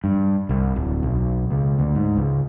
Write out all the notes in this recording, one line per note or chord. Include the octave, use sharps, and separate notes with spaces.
G2
C2
D1
B1
C#2
D2
G#2
C#2